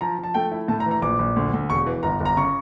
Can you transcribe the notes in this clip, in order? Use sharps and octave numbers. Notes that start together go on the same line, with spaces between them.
F3 A#5
F3 A5
A3 G5
E4
A2 A5
A#5
E3
A#5
A#1 D6
A#1
D2
D2
E1 C#6
E3
G1 A#5
G1
A#5
C#3 C#6